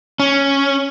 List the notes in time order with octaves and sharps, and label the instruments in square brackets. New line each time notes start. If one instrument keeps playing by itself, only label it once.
[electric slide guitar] C#4